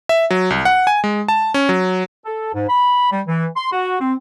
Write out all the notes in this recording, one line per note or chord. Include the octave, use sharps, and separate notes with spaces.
E5
F#3
C2
F#5
G#5
G#3
A5
C#4
F#3
A4
G#2
B5
G3
E3
C6
F#4
C4